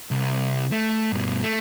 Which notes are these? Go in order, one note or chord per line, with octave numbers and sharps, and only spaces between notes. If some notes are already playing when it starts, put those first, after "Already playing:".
C2
A3
G2 B2
A3